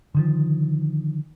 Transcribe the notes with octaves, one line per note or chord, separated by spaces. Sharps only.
D3 D#3 F3